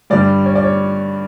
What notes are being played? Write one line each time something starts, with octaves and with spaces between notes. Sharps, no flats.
G2 D3 G3 D5
C#5
D5
C#5